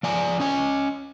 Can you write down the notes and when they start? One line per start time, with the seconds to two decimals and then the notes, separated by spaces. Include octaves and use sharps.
0.03 F3 D5 G#5 A#5
0.40 C#4 D#5 G#5